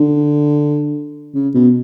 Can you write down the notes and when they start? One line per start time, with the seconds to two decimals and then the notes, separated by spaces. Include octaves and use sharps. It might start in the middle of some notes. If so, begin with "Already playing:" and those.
Already playing: D3
1.34 C#3
1.54 B2